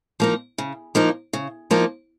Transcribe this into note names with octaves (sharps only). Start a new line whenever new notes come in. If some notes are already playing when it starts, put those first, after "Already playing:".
F3 A#3 D#4
C#3
F3 A#3 D#4
C#3
F3 A#3 D#4